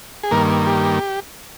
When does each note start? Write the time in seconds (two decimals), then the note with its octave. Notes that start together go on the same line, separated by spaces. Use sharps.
0.23 G#4
0.31 G2 D#3 A#3 A#4
0.67 G4